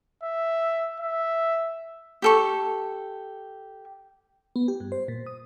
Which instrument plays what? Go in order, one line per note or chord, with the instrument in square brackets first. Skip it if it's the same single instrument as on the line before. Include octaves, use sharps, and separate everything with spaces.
[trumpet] E5
E5
[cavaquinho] G4 A4 C#6
[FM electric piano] B3
G4
G2
C5
A#2
D#6